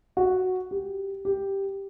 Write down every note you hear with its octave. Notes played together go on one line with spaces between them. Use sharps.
F#4
G4
G4